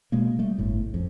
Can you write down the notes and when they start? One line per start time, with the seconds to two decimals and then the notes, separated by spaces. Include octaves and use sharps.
0.12 B2 G#3 A#3
0.39 G3 A3
0.58 G1 A2
0.94 F2